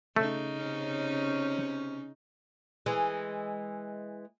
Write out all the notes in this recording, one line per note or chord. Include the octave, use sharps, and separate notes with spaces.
C#3 A3 D#4
C3 C#4
E3 G#3